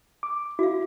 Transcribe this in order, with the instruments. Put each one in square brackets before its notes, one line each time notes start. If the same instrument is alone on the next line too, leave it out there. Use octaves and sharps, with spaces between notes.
[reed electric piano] D6
[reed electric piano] E4 [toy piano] F#4 F5